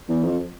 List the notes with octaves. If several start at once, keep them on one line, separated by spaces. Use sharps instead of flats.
E2
F2